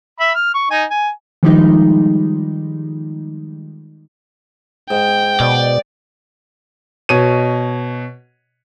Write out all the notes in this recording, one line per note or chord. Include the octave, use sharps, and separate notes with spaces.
E5 B5
F6
C#6
D#4 G#5
G#5
D#3 F3 G3 G#3 D#4
G#2 G5
B2 D5
B2 C#5 D#7